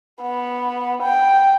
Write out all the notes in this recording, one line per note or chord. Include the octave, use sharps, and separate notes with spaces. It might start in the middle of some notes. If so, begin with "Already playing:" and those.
B3
G5